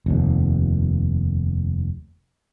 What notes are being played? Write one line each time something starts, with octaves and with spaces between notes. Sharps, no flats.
F1 D#2